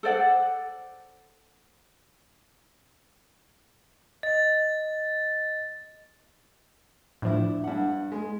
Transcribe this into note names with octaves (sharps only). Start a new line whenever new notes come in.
A4 C5 D5 F#5
D#5 A6
A2 F3 D4 E4
G2 F#5
G#3